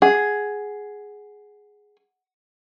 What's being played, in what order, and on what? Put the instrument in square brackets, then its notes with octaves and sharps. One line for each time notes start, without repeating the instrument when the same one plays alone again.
[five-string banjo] G#4 [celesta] F#5